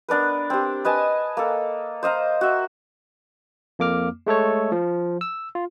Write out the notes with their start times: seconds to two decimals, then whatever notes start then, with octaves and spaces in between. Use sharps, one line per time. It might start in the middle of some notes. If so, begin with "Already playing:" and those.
0.09 B3 D4 A#4 B4
0.50 C4 G4
0.85 B4 D#5 G#5 A5
1.37 A#3 A4
2.03 C5 D#5 F5 A#5
2.41 F#4 E5
3.79 F2 A#3 D6 F6
4.27 G#3 A3 A4 C#5
4.72 F3
5.21 E6
5.55 F4